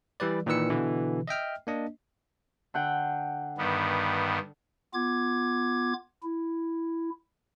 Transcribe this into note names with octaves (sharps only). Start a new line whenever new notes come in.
E3 G3 B4 D5
A#2 D#3 E3 B4 E6 C#7
B2 D3 E3
D#5 E5 G5 F6
A#3 D4 D#5
D3 F#5 G5
G2 D#3 B3
B3 F4 D6 G#6
E4